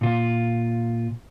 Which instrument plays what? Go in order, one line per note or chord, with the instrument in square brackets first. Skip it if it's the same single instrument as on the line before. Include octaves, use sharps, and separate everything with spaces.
[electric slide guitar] A#2 F4